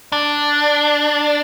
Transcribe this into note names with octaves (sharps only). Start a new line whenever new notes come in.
D4